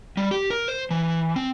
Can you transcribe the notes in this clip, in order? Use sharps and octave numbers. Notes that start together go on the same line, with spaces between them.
G3
G4
A#4
C5
E3
C4